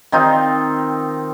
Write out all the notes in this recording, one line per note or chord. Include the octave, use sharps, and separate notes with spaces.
D#3 C4 D#4 F4